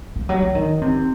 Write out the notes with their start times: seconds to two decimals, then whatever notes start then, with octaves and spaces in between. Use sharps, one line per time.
0.16 F3
0.29 F#3
0.42 E3
0.55 D#3
0.81 C3